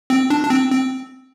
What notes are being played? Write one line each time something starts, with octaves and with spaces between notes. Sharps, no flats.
C4
D4
D4
C4
C4